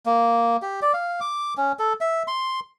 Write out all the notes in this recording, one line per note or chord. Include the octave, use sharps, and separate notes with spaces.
A#3
G4
D5
F5
D6
C#4
A4
E5
C6